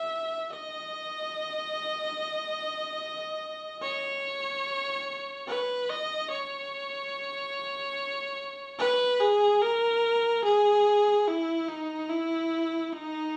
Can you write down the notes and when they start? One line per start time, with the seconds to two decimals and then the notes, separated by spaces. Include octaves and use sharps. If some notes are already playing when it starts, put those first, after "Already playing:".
Already playing: E5
0.51 D#5
3.82 C#5
5.48 B4
5.90 D#5
6.30 C#5
8.79 B4
9.20 G#4
9.61 A#4
10.44 G#4
11.27 E4
11.68 D#4
12.09 E4
12.93 D#4